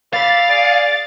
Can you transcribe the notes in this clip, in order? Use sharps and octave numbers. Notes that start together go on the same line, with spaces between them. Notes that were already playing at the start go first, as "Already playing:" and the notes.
D5 E5 F5 B5 A6
G#4 D5